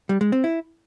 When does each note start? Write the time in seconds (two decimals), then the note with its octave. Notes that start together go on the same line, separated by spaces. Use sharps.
0.09 G3
0.21 G#3
0.32 C4
0.44 E4